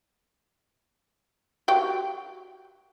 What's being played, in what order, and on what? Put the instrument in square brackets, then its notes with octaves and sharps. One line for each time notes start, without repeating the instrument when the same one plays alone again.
[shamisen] F#4 G4 G5